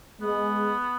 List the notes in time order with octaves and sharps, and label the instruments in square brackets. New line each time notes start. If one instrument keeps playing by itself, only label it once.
[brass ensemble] G#3 [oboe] B3